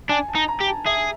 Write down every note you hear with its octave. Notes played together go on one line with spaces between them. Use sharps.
D4 G#5
A5
D#4
A#5
G4
A5
G#4 E5